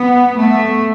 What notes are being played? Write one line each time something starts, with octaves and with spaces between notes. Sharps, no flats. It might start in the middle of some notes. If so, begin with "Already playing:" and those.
Already playing: B3
A3